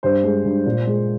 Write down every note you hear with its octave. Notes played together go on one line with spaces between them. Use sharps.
G2 C5
G#3
G2
A#2
G#3